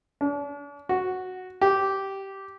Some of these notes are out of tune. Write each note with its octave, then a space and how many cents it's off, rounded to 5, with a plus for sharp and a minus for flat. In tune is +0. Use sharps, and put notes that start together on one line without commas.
D4 -40
F#4 -5
G4 -10